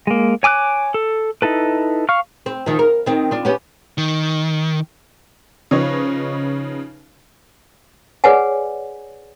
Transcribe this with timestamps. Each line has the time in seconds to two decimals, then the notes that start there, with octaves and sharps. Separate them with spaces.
0.07 G#3 A#3
0.43 C#5 G#5 D6 E6 F#6
0.94 A4
1.42 D#4 E4 A4 B4
2.09 F5 C#6 F6
2.46 C4
2.66 D#3 F3
2.79 A#4
3.06 D#3 C4
3.31 D4 F4
3.45 B3 C#4 G4
3.98 D#3
5.71 C#3 F3 D#4 B4 C#5
8.24 G#4 B4 C#5 D5 F#5 G#5